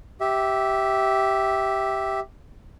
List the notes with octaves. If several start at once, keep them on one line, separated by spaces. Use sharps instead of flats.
G4 E5